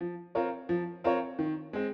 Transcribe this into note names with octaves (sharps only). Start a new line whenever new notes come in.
F3
C4 F4 A#4 C#5
F3
C4 F4 A#4 C#5
D#3
G#3 C4